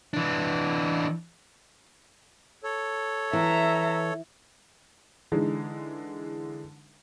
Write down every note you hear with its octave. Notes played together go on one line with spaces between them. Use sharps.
E3 D4
A4 C#5
E3 E5 A#5
D3 E3 G#3 D#4